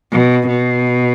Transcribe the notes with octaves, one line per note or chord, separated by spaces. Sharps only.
B2
B2